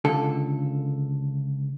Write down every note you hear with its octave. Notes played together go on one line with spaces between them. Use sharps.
C#2 D3 A4